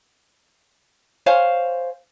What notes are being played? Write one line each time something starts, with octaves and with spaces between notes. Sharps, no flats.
C5 C#5 F5 G#5